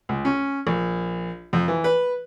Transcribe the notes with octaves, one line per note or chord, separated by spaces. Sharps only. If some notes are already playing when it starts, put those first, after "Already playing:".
C#2
C#4
A#1
F2
E3
B4